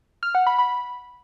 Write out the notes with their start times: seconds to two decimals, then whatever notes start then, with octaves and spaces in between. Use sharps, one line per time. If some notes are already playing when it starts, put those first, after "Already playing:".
0.23 F6
0.35 F#5
0.47 B5
0.59 B5